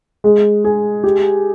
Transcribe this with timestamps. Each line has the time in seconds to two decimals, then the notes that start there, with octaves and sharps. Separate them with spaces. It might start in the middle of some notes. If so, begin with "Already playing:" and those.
0.24 G#3
0.64 G#4
1.04 G4